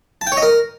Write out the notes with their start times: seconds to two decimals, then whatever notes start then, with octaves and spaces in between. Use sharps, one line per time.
0.21 A5
0.27 G5
0.32 C#5
0.37 D#5
0.42 A#4